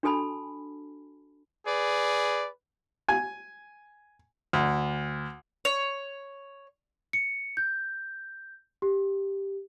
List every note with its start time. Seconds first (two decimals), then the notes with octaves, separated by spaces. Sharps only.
0.03 D4 F#4 A4 G#5 A5 B5
1.65 G#4 B4 D5
3.09 G#5
4.53 D2
5.65 C#5
7.13 C#7
7.57 G6
8.82 G4